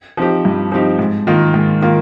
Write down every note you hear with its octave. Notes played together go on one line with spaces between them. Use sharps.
F3 C4 D#4 G4
G2
F3 C4 D#4 G4
G#2
D#3 A#3 F4
G#2
D#3 A#3 F4